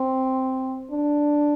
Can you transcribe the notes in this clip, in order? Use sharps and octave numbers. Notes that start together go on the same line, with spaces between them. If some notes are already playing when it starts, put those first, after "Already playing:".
Already playing: C4
D4